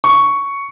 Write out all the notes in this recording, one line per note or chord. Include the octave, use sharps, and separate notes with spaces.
C#6